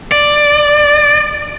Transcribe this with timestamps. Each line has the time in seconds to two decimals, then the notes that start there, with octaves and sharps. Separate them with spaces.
0.12 D5